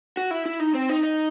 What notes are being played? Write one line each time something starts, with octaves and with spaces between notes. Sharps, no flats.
F#4
E4
E4
D#4
C4
D#4
D#4